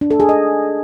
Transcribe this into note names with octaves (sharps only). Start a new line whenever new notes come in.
D4
A4
G#4
D#5